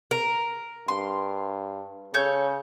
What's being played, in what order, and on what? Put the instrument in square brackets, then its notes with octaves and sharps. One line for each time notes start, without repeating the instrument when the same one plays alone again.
[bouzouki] A#4
[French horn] G2 [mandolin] C6
[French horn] C#3 [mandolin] A4 C#5 G6